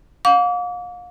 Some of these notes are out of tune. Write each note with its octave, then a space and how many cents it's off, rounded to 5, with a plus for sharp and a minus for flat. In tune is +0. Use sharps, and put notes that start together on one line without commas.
F5 +35 D6 -35